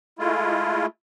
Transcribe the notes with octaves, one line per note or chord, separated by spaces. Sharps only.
G#3 A3 E4 F4